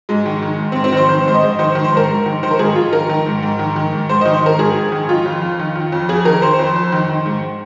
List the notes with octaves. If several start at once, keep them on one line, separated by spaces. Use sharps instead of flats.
G#2 G#3
D#3
D#3
G#2
C4
G#2
C4
D#3 C5
D#3 C5
G#2 C5
D#5
G#2
D#3 C5
D#3
C5
G#2 A#4
G#2
D#3
D#3 C5
A#4
G#2 G#4
G#2 F4
D#3 A#4
D#3
G#2
G#2
D#3
D#3
G#2
G#2 C5
D#3 D#5
C5
D#3 A#4
G#2 G#4
G#2
D#3
D#3 F4
F2
F2
D#3
D#3
F2
F2 G#4
D#3 A#4
D#3 C5
F2
F2
D#3
D#3
G#2